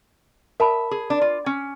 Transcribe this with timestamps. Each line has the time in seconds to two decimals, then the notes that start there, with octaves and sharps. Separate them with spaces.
0.60 A#4 E5 A5 B5
0.91 G#4
1.10 D4
1.21 F4
1.46 C#4